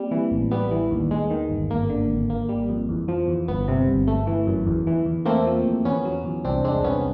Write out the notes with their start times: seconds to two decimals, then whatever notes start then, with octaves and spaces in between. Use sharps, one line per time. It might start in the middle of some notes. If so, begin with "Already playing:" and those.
Already playing: G3 A#3 C4
0.11 E3
0.31 A1
0.51 G3 B3
0.71 E3
0.91 D#2
1.11 G#3
1.30 D#3
1.50 G1
1.70 G#1 A#3
1.89 D3
2.10 G#1
2.30 A#3
2.49 G3
2.69 F2
2.89 E2
3.08 F3
3.28 E2
3.48 G1 B3
3.68 C3
3.88 G1
4.07 A3
4.27 E3
4.47 F#2
4.66 E2
4.87 E3
5.06 E2
5.25 A3 A#3 C4
5.46 F3
5.65 E2
5.85 E2 B3 C#4
6.05 F#3
6.24 E2
6.45 C2 C4 D4
6.64 G#3 C4 D4
6.84 C2 B3 C#4